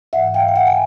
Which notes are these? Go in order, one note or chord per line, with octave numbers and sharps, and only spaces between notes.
G#2 E3 E5 F#5
F5 G5
G5
E5 F#5
G#5